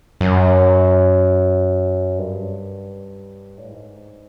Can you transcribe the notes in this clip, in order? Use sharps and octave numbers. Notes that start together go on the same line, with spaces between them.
F#2
G2
A2
G#2